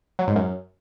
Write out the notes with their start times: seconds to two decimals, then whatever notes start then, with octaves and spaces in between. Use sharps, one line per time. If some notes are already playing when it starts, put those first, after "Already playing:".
0.19 F#3
0.27 G#2
0.36 F#2